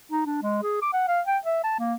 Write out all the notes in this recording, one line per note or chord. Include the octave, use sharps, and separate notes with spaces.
D#4
D4
G#3
G#4
D6
F#5
F5
G5
E5
A5
A#3